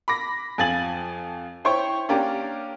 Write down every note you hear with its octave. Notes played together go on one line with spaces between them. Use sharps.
B5 D6 A#6
F2 F3 G#5 A6 F#7
E4 C5 C#5 G5 C#6
A#3 C#4 D4 G4 A#4